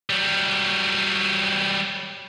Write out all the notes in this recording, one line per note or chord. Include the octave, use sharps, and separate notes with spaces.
F#3 G3